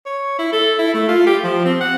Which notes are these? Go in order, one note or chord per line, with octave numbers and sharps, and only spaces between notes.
C#5
E4
A4
E4
A3
F4
G4
F3
C4
F#5